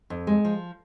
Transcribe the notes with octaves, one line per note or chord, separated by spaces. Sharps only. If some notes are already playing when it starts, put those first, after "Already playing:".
F2
G#3
F3